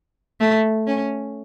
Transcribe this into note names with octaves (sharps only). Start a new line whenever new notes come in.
A3
C#4